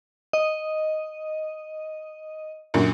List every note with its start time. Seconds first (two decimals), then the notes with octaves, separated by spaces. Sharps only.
0.33 D#5
2.74 F#2 A#2 D3